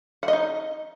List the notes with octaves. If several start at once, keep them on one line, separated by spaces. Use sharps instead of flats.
F#5
D#5
D#4